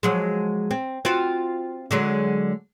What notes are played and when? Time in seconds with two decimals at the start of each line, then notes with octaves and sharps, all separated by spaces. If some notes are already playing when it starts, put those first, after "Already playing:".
0.03 F3 F#3 G#3
0.71 C4
1.05 C4 F4 F#4
1.91 D3 F#3 G#3